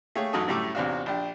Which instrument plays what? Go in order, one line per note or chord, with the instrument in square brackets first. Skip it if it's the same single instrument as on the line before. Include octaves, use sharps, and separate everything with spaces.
[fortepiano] A3 A#3 G4 G#4 C#5
A1 F#2 F#3 D#4 A4 D#5
F#2 A2 G3 A3 E5 D6
A1 E2 C3 D4 F4 F#4
A#1 D4 G4